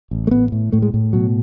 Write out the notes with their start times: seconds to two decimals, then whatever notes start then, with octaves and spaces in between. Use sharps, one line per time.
0.11 A1
0.27 A3
0.31 A2 B3
0.52 A2
0.72 A2 A3
0.82 G#3
0.94 A2
1.13 B2 F#3